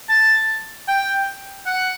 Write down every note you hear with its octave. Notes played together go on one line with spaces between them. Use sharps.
A5
G5
F#5